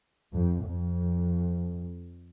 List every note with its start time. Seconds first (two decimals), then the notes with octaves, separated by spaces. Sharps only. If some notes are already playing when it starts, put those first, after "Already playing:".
0.34 F2
0.65 F2